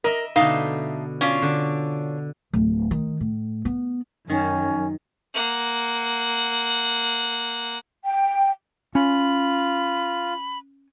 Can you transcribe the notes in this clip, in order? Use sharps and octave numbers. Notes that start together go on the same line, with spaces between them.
A#4 D#5 E5
B2 D3 A3 D#4 F5
C#4 D4 F4
D3
D1
D#3
A2
B3
F#2 D#3 C#4
A#3 F#5
G5
C#4 F4 B5